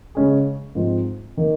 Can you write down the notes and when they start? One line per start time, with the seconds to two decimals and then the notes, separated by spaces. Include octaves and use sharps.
0.15 C#3 G#3 C#4 G#4
0.75 G#2 F3 C4 D#4
1.37 D#3 A#3